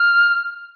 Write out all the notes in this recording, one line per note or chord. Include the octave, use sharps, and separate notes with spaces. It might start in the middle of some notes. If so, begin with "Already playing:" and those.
Already playing: F6